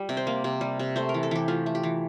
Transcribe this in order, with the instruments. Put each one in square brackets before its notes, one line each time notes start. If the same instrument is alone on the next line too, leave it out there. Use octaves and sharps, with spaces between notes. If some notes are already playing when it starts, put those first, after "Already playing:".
Already playing: [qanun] G3
C3
C5
A#3
C3
G3
C3
A3 C5
A#4
E3
A4
E3 G4
A3 F4
A3
G4
E3